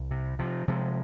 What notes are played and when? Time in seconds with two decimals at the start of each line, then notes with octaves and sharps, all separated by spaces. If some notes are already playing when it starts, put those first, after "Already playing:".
Already playing: C2
0.11 C3
0.39 C3 F3
0.68 C3 F3 G#3